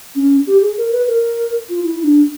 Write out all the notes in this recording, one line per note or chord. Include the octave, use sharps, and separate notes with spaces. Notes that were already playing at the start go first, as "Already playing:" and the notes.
C#4
G4
G#4
A#4
B4
A#4
F4
E4
E4
D4